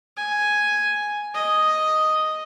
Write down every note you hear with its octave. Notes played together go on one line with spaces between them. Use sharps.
G#5
D#5